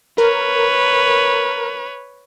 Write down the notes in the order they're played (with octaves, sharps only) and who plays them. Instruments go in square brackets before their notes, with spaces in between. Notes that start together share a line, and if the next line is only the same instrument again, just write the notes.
[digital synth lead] A#4 [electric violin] B4 C#5